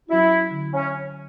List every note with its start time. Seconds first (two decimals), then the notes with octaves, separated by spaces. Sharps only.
0.09 F#3 C#4 E4 F#4
0.51 D3
0.73 C#4